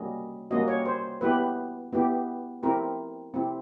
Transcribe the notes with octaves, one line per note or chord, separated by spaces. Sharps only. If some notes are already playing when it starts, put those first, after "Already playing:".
Already playing: G3 A#3 C#4 F#4 D#5
G3 A#3 C#4 F#4 D#5
C#5
C5
B3 E4 G4 B4
B3 E4 G4
C4 E4 G4 A#4
C4 E4 G4